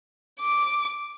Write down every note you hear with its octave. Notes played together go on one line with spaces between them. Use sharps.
D6